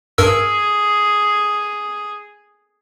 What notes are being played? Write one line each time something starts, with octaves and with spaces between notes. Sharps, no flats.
G2 G#4 A#4 E6